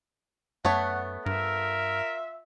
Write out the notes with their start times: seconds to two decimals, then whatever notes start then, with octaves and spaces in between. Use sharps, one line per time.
0.65 F#2 A3 B3 C#5 F#5
1.26 G2 F4 A#4 E5